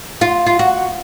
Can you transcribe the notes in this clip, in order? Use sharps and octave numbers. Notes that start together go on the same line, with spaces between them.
F4
F4
F#4